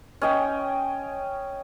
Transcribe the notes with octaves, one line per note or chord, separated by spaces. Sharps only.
C#4 D#5 G5